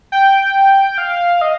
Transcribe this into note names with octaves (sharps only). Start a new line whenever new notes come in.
G5
F5
D#5